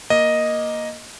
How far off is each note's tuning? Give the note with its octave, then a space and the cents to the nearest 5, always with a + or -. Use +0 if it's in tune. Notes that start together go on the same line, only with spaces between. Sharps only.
A#3 +5 D#5 +0